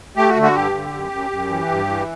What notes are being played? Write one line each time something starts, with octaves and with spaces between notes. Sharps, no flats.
A3 G4
F#4
D3
F#4
G2 G4
D3
F#2
F#2
F#2
E3
G2
E3